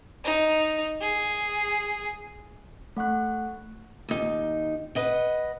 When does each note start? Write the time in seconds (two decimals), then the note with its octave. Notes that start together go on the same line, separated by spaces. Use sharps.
0.25 D#4
1.01 G#4
2.97 A3 F#5 C#6 F#6
4.09 D#2 D#4
4.95 B4 D#5 F#5